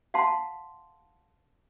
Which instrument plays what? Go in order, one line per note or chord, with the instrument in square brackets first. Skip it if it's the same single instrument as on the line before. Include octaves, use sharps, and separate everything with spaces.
[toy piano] F5 F#5 A5 C6